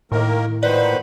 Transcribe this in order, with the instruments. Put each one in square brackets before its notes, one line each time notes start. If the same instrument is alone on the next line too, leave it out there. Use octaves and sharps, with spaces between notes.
[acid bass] A2 [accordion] D#3 A#3 A#4
[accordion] A#2 D#3 C5 [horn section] B4 F#5 [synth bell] D5